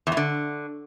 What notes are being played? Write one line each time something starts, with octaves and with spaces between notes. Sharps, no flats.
E2
A2
D3